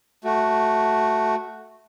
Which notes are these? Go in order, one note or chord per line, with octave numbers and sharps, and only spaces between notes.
A3 F#4